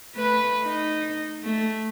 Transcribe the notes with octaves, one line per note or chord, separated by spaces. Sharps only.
A3 B4
D#4
A3